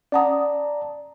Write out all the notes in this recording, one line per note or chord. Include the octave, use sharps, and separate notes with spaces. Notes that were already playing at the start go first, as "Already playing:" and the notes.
C#4 D5 F#5 A5 A#5 D#6